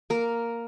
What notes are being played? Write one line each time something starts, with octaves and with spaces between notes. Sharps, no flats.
A#3 A#4